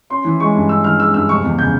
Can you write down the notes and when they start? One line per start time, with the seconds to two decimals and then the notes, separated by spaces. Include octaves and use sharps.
0.10 C#4 C6
0.25 E3
0.40 G#3 C#6
0.55 G2
0.69 C#4 E6
0.84 E3 F6
1.00 G#3 E6
1.14 G2 E6
1.29 F1 C#6
1.44 E2
1.58 C#3 G6